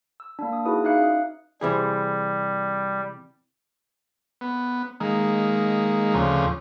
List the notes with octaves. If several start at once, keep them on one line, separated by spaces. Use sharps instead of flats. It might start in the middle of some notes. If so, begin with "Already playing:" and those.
E6
A#3 D4
D#6
D#4 E4 F#4 G#4 B4 D#6
D#4 E5 F5 D6 F#6 C#7
C#4 D#6
C3 E3 G3 G#4
B3
D#3 G#3 A#3
D2 C#3 F3